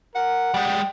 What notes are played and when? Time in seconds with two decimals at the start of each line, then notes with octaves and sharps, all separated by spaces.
0.15 A#4 F#5
0.54 G3 G#3 G5